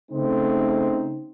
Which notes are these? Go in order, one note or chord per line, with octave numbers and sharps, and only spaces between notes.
C#3 A3 C4 D#4